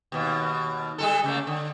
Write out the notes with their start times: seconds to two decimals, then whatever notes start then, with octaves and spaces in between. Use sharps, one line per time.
0.12 D#2 B2
0.98 G3 G#3 A4
1.24 C#3 A3 A#3
1.47 D3